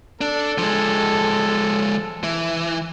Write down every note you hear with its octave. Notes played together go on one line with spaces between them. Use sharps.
D4 A4
F3 G#3
E3